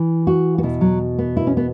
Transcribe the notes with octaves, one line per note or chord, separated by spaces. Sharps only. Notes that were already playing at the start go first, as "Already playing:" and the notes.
Already playing: E3
F#4
F#4
E2 B2 E4
F#3
B3
E4
C#4
B3